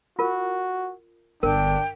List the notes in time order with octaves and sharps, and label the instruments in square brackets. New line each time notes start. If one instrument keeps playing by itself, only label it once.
[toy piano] F4 A#4 [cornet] F#4
[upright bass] G1 [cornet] D4 [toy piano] A#4 [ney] G5